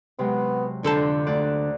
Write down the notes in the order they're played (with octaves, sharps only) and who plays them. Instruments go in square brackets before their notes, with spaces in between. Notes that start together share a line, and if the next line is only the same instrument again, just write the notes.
[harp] C3 F#3 G#3 [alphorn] B3
[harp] F2 C5 A#5 [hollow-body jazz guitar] D3 A4 A5 [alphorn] D4
[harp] D2 D5 F#6